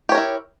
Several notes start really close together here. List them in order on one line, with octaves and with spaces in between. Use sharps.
G4 C#5 A#4 E4